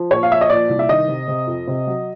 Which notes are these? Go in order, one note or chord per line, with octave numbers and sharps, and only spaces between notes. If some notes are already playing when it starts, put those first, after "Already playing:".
Already playing: F3
A#2 C#5
F5
F3 E5
D#5
A#2 D5
C2
E5
D#3 D#5
C3
C3
F2
C3
F#3